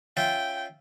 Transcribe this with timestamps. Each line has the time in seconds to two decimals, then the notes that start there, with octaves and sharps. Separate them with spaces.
0.17 C#4 F4 E5 G5